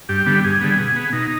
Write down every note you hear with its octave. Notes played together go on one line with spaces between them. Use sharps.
G2 G4
D3 G3 B3
G2 G#4
D3 G3 B3
B2
B3
B2 D#4